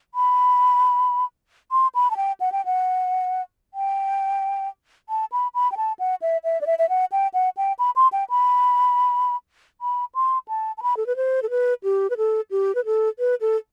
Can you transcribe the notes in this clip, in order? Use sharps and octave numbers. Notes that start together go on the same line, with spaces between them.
B5
C6
B5
A5
G5
F#5
G5
F#5
G5
A5
B5
B5
G5
A5
F#5
E5
E5
D5
E5
E5
F#5
G5
F#5
G5
B5
C6
G5
B5
B5
C6
A5
A5
B5
A4
B4
C5
A4
B4
G4
B4
A4
G4
B4
A4
B4
A4